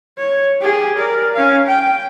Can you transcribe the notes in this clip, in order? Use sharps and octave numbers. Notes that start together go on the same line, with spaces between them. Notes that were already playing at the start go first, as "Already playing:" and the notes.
C#5
G4 G#4
A#4 D5
C#4 F5
G5